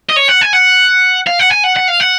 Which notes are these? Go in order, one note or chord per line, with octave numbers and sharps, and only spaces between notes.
D#5
C#5
F#5
G#5
F#5
F5
F#5
G#5
F#5
F#5
F5
F#5